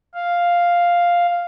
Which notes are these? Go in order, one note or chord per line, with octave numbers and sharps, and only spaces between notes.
F5